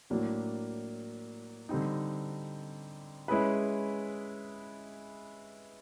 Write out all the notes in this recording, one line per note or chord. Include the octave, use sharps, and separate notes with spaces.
A2 F#3 A#3 D4
D3 G3 C4 D#4
G#3 C#4 E4 G#4 B4